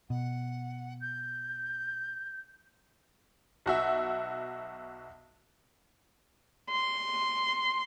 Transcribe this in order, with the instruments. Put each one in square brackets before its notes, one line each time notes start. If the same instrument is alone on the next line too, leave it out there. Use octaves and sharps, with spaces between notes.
[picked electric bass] B2 [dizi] F#5
[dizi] G6
[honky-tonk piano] B1 F#4 E5
[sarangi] C6